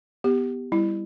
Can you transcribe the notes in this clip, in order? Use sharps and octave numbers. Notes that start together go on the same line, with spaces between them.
B3 G4
G3 E4